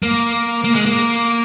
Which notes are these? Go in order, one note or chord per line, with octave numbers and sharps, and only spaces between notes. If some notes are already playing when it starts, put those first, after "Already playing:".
A#3
A#3
G#3
A#3